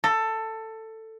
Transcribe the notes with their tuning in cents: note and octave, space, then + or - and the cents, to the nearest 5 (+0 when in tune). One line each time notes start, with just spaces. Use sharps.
A4 +15